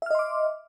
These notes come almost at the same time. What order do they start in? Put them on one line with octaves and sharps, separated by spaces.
E5 F6 D#5 C6 D6